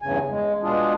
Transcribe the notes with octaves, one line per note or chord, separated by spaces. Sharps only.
E2 G2 C#3 G#5
G#3
B2 G#3 D4 F4 G#4